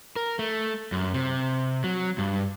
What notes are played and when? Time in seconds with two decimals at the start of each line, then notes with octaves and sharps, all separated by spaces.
0.16 A#4
0.39 A3
0.92 F#2
1.14 C3
1.84 F#3
2.18 G2